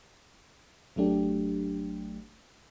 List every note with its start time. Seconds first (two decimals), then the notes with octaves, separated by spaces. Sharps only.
0.96 G#1 F#3 A3 D4 G4